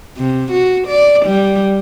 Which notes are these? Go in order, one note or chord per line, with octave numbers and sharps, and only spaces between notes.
C3
F#4
D5
G3